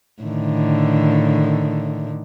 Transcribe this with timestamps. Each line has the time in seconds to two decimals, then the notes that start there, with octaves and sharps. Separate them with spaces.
0.22 A2 D3 D#3